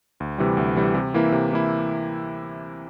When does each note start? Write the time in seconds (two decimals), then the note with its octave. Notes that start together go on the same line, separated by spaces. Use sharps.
0.20 D2
0.38 C3 E3 G3
0.57 D2
0.76 C3 E3 G3
0.94 C3
1.14 E3 A#3 E4
1.32 C3
1.51 E3 A#3 E4